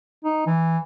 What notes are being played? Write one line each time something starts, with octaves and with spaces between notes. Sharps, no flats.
D#4
E3